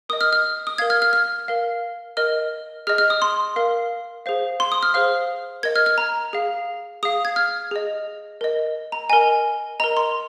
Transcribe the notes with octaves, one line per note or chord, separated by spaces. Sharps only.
A#4 D#5 D#6
F6
F6
D#6
A#4 F5 G#6
F6
F6
F6
A#4 F5
A#4 D#5 F6
G#4 D#5 F6
F6
D#6
C6
A#4 F5
G#4 C5 F5
C6
D#6
F6
G#4 C5 F5 F6
A#4 D#5 G#6
F6
F6
A#5
G#4 F5
G#4 F5 D#6
G#6
F6
G#4 D#5
A#4 D#5
A#5
A#4 D#5 G#5
A#4 D#5 A#5
C6